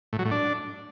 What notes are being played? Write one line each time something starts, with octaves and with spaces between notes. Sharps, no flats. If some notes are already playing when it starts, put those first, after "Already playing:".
A2
F#3
A2
D4